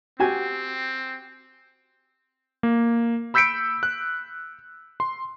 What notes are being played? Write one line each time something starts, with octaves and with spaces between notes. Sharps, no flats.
C4 F#4 G4 G#5
A#3
B5 E6 G6 B6 C#7 D7
F#6
C6